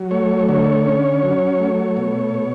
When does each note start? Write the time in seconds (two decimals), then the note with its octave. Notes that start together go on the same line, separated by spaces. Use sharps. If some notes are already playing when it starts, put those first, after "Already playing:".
Already playing: F#3
0.11 A3 C#5
0.49 D3 C#5
0.85 C#4
1.23 F#3
1.60 A3
1.97 B2
2.34 B2